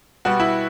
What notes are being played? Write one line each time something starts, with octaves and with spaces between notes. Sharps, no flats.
B2 G3 B3 F#4
E4